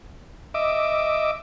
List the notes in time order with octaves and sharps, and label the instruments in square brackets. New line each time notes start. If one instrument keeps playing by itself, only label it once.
[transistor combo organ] D#5 E5 D6